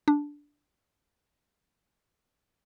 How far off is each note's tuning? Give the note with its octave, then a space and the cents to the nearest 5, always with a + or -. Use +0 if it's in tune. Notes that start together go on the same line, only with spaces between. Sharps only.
D4 -5